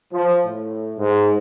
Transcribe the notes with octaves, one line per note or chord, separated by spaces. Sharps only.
F3
A2
G#2